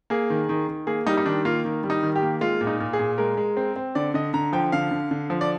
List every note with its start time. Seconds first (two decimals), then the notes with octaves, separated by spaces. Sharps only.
0.10 A#3 G#4
0.30 D#3
0.49 D#3
0.68 D#3
0.87 A#3 G#4
1.07 G3 D#4
1.18 D#4
1.26 D#3 D4
1.45 A#3 F4
1.65 D#3
1.84 G3
1.90 D#4
2.03 D#3
2.16 G4
2.22 A#3
2.41 G#3 F4
2.61 A#2
2.67 D#4
2.80 A#2
2.93 G#4
2.99 A#2
3.18 G#3 A#4
3.37 G#3
3.57 C4
3.76 C4
3.95 D3 D5
4.14 D3 D#5
4.34 D3 A#5
4.53 F3 G5
4.72 D3 F5
4.91 D3
5.11 D3
5.30 F3
5.41 D5